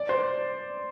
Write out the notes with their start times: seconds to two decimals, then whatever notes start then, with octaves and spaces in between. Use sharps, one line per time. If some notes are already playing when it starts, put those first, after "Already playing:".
Already playing: D5
0.09 C5